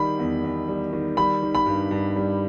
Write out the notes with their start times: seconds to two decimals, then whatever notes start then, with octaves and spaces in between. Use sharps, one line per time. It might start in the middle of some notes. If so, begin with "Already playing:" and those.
Already playing: D#3 G3 B5
0.19 E2
0.44 E2
0.68 G3
0.93 D#3
1.17 G3 B5
1.42 D#3
1.55 B5
1.66 G2
1.91 G2
2.16 G3